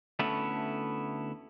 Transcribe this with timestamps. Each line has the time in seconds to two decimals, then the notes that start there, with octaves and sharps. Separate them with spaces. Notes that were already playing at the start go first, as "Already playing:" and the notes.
0.19 D2 A3 B3 C#4 E4 A4